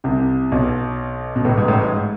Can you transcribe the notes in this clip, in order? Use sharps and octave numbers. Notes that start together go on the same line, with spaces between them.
C2 C3
B1 B2
B2
A1 A2
G#2
A1 A2
G#2